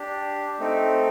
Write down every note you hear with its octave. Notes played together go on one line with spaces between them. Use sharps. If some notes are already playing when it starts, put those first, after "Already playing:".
Already playing: D4 G4
A3 C4 D#4